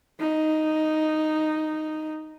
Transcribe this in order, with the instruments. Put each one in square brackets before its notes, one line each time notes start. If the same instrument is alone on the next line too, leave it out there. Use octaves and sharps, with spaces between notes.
[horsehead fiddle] D#4